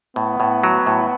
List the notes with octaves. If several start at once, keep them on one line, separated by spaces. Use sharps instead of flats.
A2 B3
A2
F#3
A2